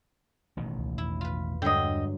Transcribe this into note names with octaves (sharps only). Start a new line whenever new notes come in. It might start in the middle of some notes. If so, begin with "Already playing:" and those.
A1 B2 D#3
C#2
E2 E4
F4 B4
G2 D3 F#3 G#3 D#5 G5